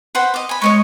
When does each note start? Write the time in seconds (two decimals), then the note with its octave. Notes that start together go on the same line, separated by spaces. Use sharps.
0.15 B4 C5 F#5
0.34 D#5 D6
0.49 G#5 B5
0.62 G#3 C#5 D#5 C#6